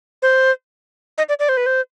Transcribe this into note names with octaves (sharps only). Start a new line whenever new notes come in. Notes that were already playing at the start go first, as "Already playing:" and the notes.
C5
D#5
D5
D5
C5
B4
C5